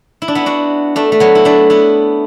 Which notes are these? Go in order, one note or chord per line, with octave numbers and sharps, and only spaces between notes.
E4
D4
B3 E4
D4 F#4
A3 D4
A3
F#3 B3
E4
A3 D4
B3 E4